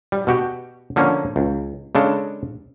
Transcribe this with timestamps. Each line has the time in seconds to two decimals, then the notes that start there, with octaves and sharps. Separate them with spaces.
0.12 G3
0.27 B2 F#4 G4
0.96 D3 F3 A#3 C#4
1.36 C#2
1.95 C#3 G#3 D4 A4